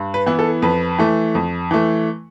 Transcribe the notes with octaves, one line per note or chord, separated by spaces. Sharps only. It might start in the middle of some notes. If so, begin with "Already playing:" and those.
Already playing: G2
B4
E3 B3 E4
A4
F2 B4
E3 A3
F2
E3 A3